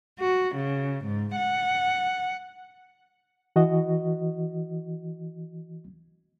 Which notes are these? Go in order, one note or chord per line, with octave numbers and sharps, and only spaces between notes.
F#4
C#3
G#2
F#5
E3 F#4 D#5